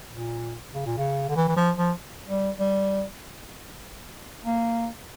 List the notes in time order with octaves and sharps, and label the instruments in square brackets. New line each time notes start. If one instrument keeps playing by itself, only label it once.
[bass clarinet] A#2
C#3
A#2
C#3
D3
E3
E3
F3
F3
G3
G3
A#3